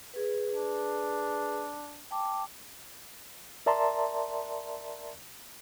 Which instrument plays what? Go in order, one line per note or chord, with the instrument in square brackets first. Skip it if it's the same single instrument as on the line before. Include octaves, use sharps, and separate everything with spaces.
[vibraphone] G#4 B4
[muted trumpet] D4
[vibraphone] G5 A5 D6
[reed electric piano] A#4 D5 E5 A5 A#5 C6